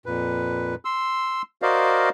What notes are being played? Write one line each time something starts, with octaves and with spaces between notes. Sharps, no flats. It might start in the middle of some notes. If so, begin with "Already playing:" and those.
F2 A#2 B4
C6 E6
F#4 A#4 C5 D5 D#5 F5